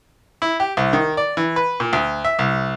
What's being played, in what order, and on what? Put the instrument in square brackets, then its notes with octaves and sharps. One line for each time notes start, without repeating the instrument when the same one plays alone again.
[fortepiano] E4
G4
C2
D#3
D5
E3
B4
A#2
D2
E5
C2